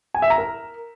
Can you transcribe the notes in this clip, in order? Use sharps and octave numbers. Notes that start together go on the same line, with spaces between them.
G#5
E5
A#5
A#4